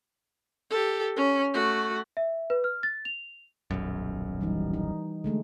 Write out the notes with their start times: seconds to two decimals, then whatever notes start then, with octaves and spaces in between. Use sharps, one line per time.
0.70 G4 A4
1.16 C#4
1.53 A3 F#4
2.17 E5
2.50 B4
2.64 F6
2.83 A6
3.05 F7
3.71 D#1 B1 F#2
4.41 E3 G3 D#4
4.74 D#4
5.24 D3 G#3 A3